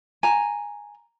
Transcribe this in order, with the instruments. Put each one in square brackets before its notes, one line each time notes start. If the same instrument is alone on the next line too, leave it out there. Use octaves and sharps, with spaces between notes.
[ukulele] G#5 A#5